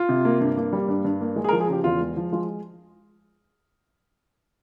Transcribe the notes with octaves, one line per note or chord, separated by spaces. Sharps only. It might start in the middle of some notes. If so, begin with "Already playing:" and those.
Already playing: F4
C3
A#3
G2
A#3
G3
G2
G2
A#3
G#3
G#4
A#4
F3
G#4
C#3 G4
E2 F4
G#3
F3
G#3 F4